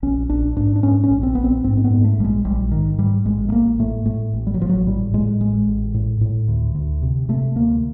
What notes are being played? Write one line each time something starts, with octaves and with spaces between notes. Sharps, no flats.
A#1 C#4
A#1 D4
G#2 D4
D4
G#2 C#4
C#4
A#1
C4
A#1 B3
C4
G#2 C4
C4
B3
G#2
A3
A#1 G3
G#3
A#1 G3
G#2 D#3
G#2 G3
A1 G#3
A3
A1 A#3
A2 A3
A2 A3
A1
G3
F#3
A1 F3
F#3
A2 G3
A2 G#3
A1 G#3
A1
A2
A2
D2
D2
C3
C3 A3
D2 A#3